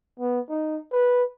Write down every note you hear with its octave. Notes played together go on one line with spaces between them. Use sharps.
B3
D#4
B4